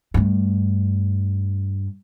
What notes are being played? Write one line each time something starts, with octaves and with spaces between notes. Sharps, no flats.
G2 A3